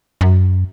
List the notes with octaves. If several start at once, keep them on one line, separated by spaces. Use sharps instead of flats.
F#2